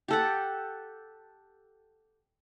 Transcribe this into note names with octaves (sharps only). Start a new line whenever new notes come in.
G4 A4 F#5